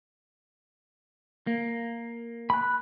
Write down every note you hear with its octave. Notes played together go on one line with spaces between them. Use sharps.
A#3
B5 F#6